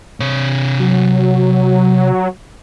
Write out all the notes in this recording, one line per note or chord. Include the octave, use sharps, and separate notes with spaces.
C3 C#5
F#3